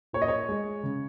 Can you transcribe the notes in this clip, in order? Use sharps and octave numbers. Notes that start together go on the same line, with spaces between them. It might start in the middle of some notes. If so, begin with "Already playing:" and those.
A#2 C#5
D#5
C#5
G#3
C#3